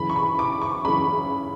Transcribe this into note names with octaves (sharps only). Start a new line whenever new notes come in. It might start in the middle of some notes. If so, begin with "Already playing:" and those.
Already playing: F#2 C#3 E3 B5
C#6
B5
D6
C#6
F#2 C#3 E3 B5